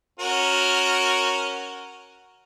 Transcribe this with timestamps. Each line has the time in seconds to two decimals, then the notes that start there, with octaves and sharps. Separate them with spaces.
0.19 C#4 F#4 A#4